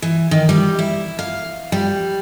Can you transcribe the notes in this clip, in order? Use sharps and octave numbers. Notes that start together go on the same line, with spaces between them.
E3
D#3
G3
E4
F5
G3